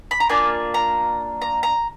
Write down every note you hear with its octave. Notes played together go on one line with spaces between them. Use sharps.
B5
A#5
A#3 D4 F4 G#5
A#5
A#5
A#5